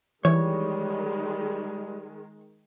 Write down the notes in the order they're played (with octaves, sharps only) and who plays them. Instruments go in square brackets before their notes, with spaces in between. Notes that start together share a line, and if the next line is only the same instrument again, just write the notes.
[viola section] D#3 G#3 [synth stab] E3 [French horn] G3 [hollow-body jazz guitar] C#5